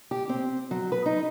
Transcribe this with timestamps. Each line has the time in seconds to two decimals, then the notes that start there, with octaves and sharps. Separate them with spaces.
0.11 G4
0.29 C4
0.71 F#3
0.92 B4
1.06 D#4